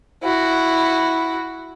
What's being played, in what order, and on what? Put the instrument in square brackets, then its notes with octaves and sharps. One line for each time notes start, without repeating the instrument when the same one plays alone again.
[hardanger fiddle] E4 F#4